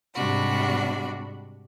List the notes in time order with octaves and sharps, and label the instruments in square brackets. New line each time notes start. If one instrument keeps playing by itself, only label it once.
[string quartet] G#2 C3 G3 D4 F#4 B5